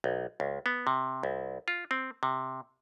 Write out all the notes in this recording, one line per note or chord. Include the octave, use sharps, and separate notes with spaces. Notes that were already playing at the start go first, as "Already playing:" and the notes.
B1
C#2
B3
C3
C2
F4
C4
C3